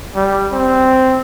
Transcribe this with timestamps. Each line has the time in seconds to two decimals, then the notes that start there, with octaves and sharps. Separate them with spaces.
0.16 G3
0.52 C4